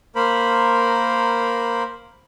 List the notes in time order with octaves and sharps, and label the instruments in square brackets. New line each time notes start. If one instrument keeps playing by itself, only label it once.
[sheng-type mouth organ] A#3 A#4 C5 B5